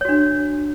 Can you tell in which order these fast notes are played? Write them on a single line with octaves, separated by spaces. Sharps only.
C#5 F#4 D4